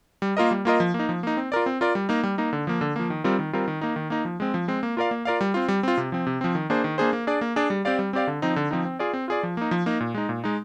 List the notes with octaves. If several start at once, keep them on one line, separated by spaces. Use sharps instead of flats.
G3
A#3 F4 A#4 D#5
G3
A#3 F4 A#4 D#5
F3
A#3
D#4
F3
A#3 D#4
C4
F4 A#4 D5
C4
F4 A#4 D5
G3
A#3 D#4
G3
A#3 D#4
D3
F3 A#3
D3
F3 A#3
D#3
G3 C4 F4 A#4
D#3
G3 C4 F4 A#4
D#3
A#3 D#4
D#3
A#3 D#4
F3
G#3 C4
F3
G#3 C4
A#3
F4 A#4 D5 F5
A#3
F4 A#4 D5 F5
G3
C4 F4
G3
C4 F4
C3
F3 C4
C3
F3 C4
D#3
A#3 D4 G#4 C5
D#3
A#3 D4 G#4 C5
A#3
D4 G#4 D5
A#3
D4 G#4 D5
G3
C4 G4 D5 F5
G3
C4 G4 D5 F5
D3
F3 C4 D#4
D3
F3 C4 D#4
C4
F4 G#4 D5
C4
F4 G#4 D5
F3
A#3 D#4
F3
A#3 D#4
A#2
G#3 D#4
A#2
G#3 D#4